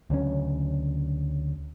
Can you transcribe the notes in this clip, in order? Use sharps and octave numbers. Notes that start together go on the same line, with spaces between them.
D2 C#3 F#3 C#4